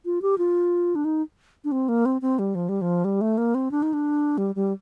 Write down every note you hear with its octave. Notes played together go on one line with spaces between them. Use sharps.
F4
G4
F4
D4
D#4
D4
C4
A#3
C4
C4
G3
F3
G3
F3
G3
A3
A#3
C4
D4
D#4
D4
G3
G3